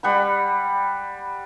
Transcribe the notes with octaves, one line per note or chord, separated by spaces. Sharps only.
G3 F#5 B5